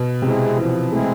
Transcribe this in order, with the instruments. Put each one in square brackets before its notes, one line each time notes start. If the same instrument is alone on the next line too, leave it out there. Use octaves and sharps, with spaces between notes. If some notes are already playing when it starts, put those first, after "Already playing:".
Already playing: [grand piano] B2
[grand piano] C3 [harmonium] G#3 C4 E4 G#4
[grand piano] E3 [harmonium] F3
[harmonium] G#3 C4 E4 G#4 [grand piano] A3